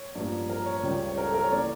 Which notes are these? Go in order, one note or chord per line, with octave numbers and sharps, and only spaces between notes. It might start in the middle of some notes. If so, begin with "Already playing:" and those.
Already playing: C#5
A1 G2 F3 A#3
A#4
C#5
C#2 C#3 G3 C#4
C#5
A#4
A4
A#4
C#5
E3 A#3 C#4 D5